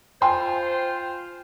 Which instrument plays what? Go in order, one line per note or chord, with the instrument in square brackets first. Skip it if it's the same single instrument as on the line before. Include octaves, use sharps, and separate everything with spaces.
[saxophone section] F4 C5 [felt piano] G5 G#5 C6